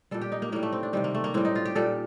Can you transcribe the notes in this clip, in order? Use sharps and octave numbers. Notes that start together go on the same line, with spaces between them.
A#2 G3 A4
G4
D#4
A#3
A2 G3 A#3
A3
C4
D4
C3 D#3 G3 C4
A#3
A3
A#3
A2 G3 C4
D#4
F4
G4
A#2 G3 A4